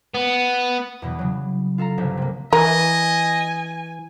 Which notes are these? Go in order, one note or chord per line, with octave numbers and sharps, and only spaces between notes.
B3
E2 B2 E3 G3
C#3 F#3
F4 A4 F5 A#5
G1 C2 F3
C3 A#3
E3 A#4 D#5 G#5